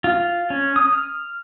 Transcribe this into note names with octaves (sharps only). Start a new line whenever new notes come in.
F4
C#4
D#6
F6